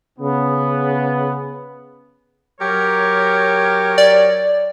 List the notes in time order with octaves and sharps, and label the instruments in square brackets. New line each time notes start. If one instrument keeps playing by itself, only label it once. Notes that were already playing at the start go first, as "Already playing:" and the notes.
[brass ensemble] C#3 B3
[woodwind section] F#3 A#4 C#5 [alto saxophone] G4
[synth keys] D5